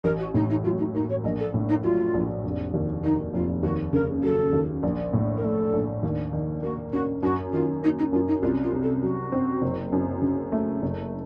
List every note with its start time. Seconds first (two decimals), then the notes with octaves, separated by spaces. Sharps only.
0.04 A1 A#4
0.19 F#4
0.34 A2 D#4
0.50 D#4
0.64 F#3 F4
0.79 D#4
0.94 A#3 D#4
1.09 C#5
1.23 A#1 D#5
1.39 A4
1.54 A2
1.69 D#4
1.83 F#3 F4
2.14 A#1
2.44 F1
2.74 D#2
3.03 D#3 D#4
3.34 F1 F4
3.63 D#2 F#4
3.93 C#3 A#4
4.23 F#3 A4
4.53 D#2
4.83 A#1
5.13 A2
5.37 A#4
5.43 A3 A4
5.73 A#1
6.03 D#2
6.33 D#3
6.63 A#3 F#4
6.92 C#4 F#4
7.23 F#2 F#4
7.52 D#3 F4
7.83 A#3 D#4
7.98 D#4
8.13 F#2 F4
8.27 D#4
8.42 C2 F4
8.63 F4
8.73 C3
8.83 A4
9.02 F#3 F#4
9.32 C4
9.62 F#1
9.92 F#2
10.22 C#3
10.52 A3
10.82 F#1